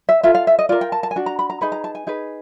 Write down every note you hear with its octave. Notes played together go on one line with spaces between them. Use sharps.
E5
F4 A4 E5
F5
E5
D#5
F4 A#4 D5
G5
A5
A5
G#5
D4 F#4
A#5
B5
A#5
D#4 G#4 B4 B5
A#5
A5
G#5
D#4 G#4 B4